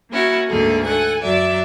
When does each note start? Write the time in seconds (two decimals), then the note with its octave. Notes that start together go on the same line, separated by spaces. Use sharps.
0.10 A#3 C#4 E4 F#4
0.48 D2 G#2 D3 A#3 G#4 A4
0.84 A4 F#5 G#5
1.21 F#2 F#3 D5 E5